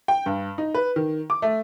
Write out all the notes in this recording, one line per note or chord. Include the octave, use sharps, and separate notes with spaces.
G5
G2
D#4
B4
D#3
D6
A3